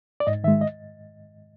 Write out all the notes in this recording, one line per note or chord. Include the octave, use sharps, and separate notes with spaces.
D5
G#2 D#5
D#3 G#3 E5
D#5